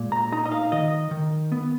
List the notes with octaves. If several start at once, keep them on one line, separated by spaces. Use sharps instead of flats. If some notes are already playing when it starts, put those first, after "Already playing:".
Already playing: A#2 G#3
A#5
D#4 A#5
D#5
F5
D#3 D#5
D#3
B3